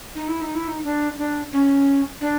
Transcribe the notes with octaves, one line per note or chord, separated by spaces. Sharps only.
D#4
E4
D#4
E4
D#4
D4
D4
C#4
D4